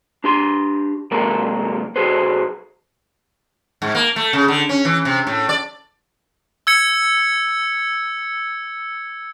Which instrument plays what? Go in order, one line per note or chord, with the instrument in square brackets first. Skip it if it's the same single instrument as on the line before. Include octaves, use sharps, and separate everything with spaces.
[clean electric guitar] D4 G4 C6
F#2 C3 G#3 A#3 A4 A#4
B1 F#4 G#4 A4 B4 C5
[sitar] G#2
A#3
A3
C#3
D3
C#4
E3
C3
A2
D5
[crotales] E6 G#6 C#7